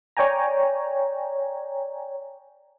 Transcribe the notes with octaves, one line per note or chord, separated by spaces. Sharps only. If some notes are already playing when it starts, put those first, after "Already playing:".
C#5 D5 G5 G#5 A#5